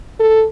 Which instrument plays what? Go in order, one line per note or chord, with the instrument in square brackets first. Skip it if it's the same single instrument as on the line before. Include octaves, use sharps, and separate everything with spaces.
[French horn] A4